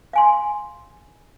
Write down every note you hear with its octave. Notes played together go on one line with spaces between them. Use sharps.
F5 G#5 C6